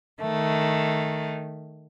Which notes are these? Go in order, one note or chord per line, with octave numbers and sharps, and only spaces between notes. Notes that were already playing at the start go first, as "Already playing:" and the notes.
D#3 A3